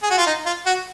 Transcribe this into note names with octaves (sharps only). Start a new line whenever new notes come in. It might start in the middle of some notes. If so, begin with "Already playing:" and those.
G#4
F#4
F4
D#4
F4
F#4